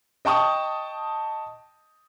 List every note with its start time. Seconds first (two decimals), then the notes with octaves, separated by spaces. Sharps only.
0.25 D#5 G5 A5 C#6 D#6